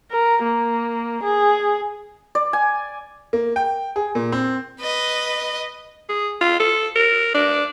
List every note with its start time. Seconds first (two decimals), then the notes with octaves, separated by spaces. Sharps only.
0.11 A#4
0.43 A#3
1.24 G#4
2.35 D5
2.53 G#5
3.33 A#3
3.56 G5
3.96 G#4
4.15 A#2
4.32 C4
4.81 B4 D#5
6.09 G#4
6.41 F4
6.60 A4
6.96 A#4
7.34 D4